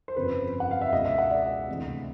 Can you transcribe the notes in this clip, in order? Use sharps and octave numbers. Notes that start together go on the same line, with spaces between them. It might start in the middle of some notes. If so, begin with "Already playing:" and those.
C5
G1 F2 C#3 F3 B4
F#5
F5
E5
C#2 B2 G#3 D#5
E5
F#5
D5
D2 C3 E3